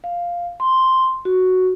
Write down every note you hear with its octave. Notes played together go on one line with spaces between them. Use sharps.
F5
C6
F#4